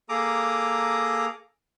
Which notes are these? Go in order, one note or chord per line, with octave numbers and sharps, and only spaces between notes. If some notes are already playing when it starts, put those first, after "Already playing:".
A#3 G#4 A4 A#5 D6 D#6